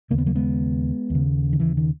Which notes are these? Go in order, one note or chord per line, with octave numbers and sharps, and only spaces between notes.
D#2 C#3 A#3
B3
F#3 A#3
G#3 B3
D#2 C#3
D#3
E3
D#3